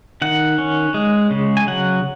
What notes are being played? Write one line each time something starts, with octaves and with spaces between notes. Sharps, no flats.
D#3 F#5
C#4
G#3
C#3
G#5
F#3 F#5